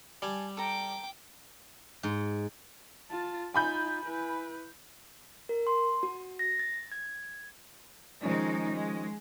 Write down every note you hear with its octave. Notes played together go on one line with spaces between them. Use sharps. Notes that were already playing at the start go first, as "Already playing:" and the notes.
G3 G#5 A5
A4 G5 A#5 D6
G#2
F4 A5
D#4 F4 G#5 B5 G6
E4 B4
A#4
C6
F#4
A#6
A6
G#6
D#3 F3 G#3 C#4 D#4
G#3